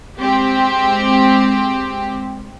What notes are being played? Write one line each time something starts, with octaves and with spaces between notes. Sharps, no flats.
G#3 C4 G4